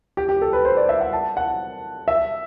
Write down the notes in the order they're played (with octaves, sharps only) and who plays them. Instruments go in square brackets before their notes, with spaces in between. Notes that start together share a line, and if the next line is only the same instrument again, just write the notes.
[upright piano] G4
G4
A4
B4
C5
D5
E5
F#5
A5
F#5
E5